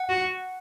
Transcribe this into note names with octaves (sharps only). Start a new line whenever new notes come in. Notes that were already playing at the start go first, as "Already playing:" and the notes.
Already playing: F#5
F#4